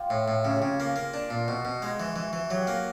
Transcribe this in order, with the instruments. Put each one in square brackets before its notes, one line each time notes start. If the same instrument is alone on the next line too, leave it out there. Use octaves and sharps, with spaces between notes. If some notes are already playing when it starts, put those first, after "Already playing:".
Already playing: [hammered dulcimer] F4 G4
[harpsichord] A2
A2
[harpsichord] C#3 [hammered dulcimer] G4
[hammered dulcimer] G#4
[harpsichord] C#3
[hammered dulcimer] G4
[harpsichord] A#3 [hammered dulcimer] G#4
[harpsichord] A#3
D4
A#2
[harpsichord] B2 [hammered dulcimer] F#4
[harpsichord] B2
[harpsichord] G#3 [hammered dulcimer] F#4
[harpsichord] E3
E3
E3
[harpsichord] F#3 [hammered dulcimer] G4
[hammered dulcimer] G#4
[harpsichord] A#3